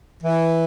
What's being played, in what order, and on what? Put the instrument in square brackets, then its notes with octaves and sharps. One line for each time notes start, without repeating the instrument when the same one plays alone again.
[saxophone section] E3